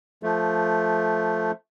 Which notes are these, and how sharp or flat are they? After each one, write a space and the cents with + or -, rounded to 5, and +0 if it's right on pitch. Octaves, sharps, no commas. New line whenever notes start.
F3 +0 A3 +0